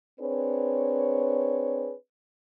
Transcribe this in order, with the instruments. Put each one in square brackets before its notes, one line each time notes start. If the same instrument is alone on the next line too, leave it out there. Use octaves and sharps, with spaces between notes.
[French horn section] C4 D4 G#4 B4 C#5